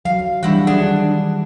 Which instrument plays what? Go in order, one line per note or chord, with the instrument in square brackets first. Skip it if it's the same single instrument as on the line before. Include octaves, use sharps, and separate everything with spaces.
[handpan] F#3 [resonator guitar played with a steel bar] F5
[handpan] E3 G3 D4 [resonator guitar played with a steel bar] C4 E4 F#4
[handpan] D#3 F#5 [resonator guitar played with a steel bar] D4 G#4